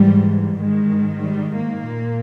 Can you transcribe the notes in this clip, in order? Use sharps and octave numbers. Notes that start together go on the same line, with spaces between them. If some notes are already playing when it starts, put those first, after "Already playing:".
Already playing: G#2 E3 G3
G#2 D#3 G#3
G3
A#3
A#2